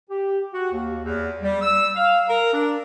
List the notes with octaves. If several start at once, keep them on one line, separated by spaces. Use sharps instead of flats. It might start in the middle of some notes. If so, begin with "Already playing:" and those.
G4
F#4
D#2
E2
G3
E6
F5
A#4
D4